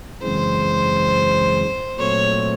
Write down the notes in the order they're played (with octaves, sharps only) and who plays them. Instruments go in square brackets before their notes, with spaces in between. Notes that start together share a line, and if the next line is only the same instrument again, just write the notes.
[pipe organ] F#2 C#3 E3 G#3 C4 [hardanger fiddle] C5
[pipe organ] A#2 F#3 A3 C4 [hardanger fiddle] C#5